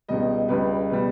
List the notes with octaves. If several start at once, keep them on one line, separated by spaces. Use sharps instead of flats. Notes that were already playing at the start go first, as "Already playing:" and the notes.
C#2 B2 G3 D#5
C#2 C#3 G3 B4
B2 G3 B4